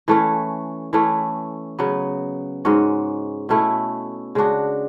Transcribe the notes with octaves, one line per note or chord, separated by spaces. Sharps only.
E3 A3 C#4
E3 A3 C#4
C#3 F#3 B3
G#2 G#3 C#4 F#4
B2 A3 C#4 E4
C#3 G#3 D4 F#4